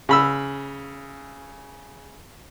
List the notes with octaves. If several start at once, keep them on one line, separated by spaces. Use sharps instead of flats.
C#3 B5 E6